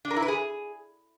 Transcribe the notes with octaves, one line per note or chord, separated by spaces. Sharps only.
D4
A#4
E4
B4
G#4